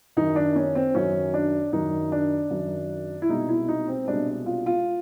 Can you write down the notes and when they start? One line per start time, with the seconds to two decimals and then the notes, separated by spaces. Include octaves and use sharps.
0.17 F#2 D#3 F#3 D#4
0.36 D4
0.56 C#4
0.75 C4
0.94 F#2 D#3 F#3 C#4
1.34 D4
1.72 F#2 D#3 F#3 D#4
2.12 D4
2.50 F#2 D#3 F#3
3.22 E4
3.29 C2 B2 G#3 D#4
3.48 E4
3.68 D#4
3.88 C4
4.08 C2 B2 G#3 D4
4.46 F4
4.66 F4